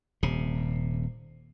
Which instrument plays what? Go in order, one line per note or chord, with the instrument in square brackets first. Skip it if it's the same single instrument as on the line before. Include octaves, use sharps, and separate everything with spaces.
[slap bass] D#1 C3